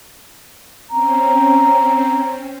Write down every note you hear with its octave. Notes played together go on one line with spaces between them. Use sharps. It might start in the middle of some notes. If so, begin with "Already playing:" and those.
C4 C#4 A#5